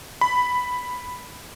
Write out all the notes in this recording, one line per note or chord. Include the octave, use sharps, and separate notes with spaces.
B5